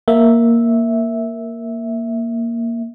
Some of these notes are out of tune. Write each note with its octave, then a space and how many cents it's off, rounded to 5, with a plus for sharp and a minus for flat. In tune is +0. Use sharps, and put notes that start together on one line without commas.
A#3 +0 E5 -5